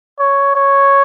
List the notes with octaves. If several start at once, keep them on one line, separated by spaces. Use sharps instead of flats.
C#5
C#5